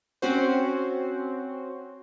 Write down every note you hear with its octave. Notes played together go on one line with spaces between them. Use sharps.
C4 C#4 F#4 C5